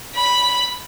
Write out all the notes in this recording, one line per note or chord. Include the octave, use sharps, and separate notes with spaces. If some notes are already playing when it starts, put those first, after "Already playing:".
B5